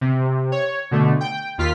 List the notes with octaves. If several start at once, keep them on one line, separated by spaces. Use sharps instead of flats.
C3
C#5
B2 D3 A3
G5
D#2 F4 F6 B6